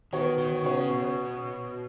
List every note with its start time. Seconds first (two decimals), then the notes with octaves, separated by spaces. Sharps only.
0.13 D#3 B3 F#4 C#5
0.38 D#3
0.64 C#3 B3 F#4 C#5
0.89 B2